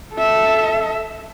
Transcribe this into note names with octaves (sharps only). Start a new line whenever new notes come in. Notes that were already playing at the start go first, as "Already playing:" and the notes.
A4 E5